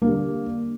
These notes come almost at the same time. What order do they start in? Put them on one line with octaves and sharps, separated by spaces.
A#3 D3 G3